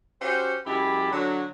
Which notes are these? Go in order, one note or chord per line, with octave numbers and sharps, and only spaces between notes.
C#4 F#4 G4 C5
F#2 G#3 E4 G4 A5 B5
D3 F#3